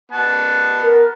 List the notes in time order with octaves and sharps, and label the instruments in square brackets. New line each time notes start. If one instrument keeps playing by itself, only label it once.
[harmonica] B3 A5
[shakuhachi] A#4